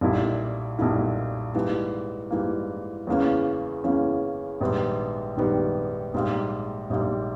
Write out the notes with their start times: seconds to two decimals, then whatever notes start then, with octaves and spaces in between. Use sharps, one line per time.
0.01 B1 A#2 G3 A#3 E4
0.78 B1 A#2 G3 A#3 E4
1.54 G#2 E3 G3 A#3
2.31 G#2 E3 G3 A#3
3.07 E2 C#3 E3 A#3 C#4
3.84 E2 C#3 E3 A#3 C#4
4.61 A#1 G#2 D#3 G3 B3
5.37 A#1 G#2 D#3 G3 B3
6.14 A#1 G#2 G3 A#3
6.90 A#1 G#2 G3 A#3